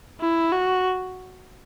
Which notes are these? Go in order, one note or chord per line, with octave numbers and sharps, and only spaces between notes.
E4
F#4